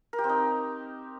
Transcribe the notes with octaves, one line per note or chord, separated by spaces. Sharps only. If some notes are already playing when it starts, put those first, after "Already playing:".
A#4
G4
C4
D#4